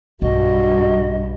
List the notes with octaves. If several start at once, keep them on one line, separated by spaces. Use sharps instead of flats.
B1 G2 F#4 D#5